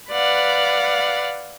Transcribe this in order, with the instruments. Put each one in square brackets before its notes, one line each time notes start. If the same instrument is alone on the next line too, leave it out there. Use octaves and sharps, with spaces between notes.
[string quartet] B4 D5 F5 F#5